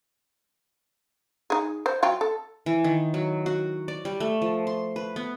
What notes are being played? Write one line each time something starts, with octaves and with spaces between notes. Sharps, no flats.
D#4 G#4
C5
F#3 F4 G5
A4
E3
D#3
F#3
F#4
D5
G3
A3
F3
C6
B4
B3